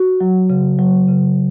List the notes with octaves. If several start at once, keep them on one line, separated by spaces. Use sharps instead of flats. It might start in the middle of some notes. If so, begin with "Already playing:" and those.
Already playing: F#4
F#3
C#3
F#3
C#3